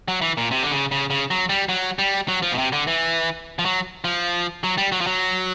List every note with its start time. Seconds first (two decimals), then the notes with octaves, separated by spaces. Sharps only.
0.08 F#3
0.22 E3
0.37 A#2
0.51 C3
0.63 D3
0.71 C#3
0.91 C#3
1.10 C#3
1.31 F#3
1.49 G3
1.69 F#3
1.99 G3
2.28 F#3
2.42 F3
2.52 B2
2.58 C3
2.73 D3
2.87 E3
3.59 F3
3.65 F#3
4.04 F3
4.64 F#3
4.78 G3
4.92 F#3
5.01 F3
5.07 F#3